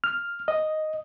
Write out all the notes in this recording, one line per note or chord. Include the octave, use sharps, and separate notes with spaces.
F6
D#5